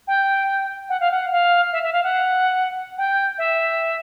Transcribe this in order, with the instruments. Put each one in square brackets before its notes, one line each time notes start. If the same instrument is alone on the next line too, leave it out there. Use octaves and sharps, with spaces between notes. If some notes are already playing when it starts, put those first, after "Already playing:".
[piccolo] G5
F#5
F5
F#5
F5
E5
E5
F5
F#5
G5
E5